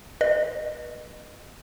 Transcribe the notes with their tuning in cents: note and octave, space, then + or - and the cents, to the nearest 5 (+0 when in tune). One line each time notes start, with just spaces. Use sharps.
B4 -30 D#5 -35